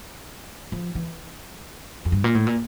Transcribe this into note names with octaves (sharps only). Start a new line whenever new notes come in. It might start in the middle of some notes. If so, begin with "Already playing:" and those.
F3
E3
F2
G2
A#2
A2
A#2